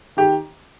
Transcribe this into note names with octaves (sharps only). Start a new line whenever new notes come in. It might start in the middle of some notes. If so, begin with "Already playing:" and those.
D#3 G4